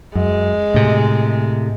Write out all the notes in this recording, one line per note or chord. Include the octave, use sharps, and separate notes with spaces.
F#2 G#3
A2 C3